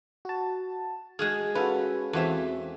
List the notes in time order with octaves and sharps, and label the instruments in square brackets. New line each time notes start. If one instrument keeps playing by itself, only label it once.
[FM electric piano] F#4 A5
[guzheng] G#3 F#4 G#4 [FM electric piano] F6
[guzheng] C#4 F4 [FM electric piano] F#4 A4 B4
[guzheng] E2 F4 E5 [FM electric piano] C4 F#4 A4